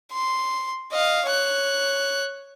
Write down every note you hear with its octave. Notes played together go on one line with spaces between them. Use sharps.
C6
D#5 F5
C#5 F#6